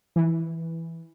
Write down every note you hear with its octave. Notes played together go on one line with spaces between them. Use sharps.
E3